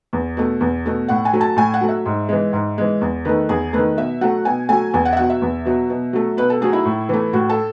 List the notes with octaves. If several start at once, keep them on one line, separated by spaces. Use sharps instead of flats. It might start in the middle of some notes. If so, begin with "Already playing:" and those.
E2
B2 A3
E2
B2 A3
A2 F#5
G#5
F#3 A3
A5
A2 G#5
F#5
F#3 A3
E5
G#2
E3 G#3
G#2
E3 G#3
E2
D#3 A3 B4
E2 G#4
D#3 A3 B4
B2 E5
F#3 A3 F#5
B2 G#5
F#3 A3 G#5
E2 G#5
F#5
E5
B2 F#3 F#5
E5
E2
B2 F#3
B2
F#3 A3
B2 B4
A4
F#3 A3 G#4
E4
A2
E3 A3
A2 F#4
A4